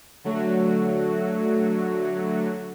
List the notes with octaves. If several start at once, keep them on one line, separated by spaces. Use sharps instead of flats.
D3 F#3 A3 F#4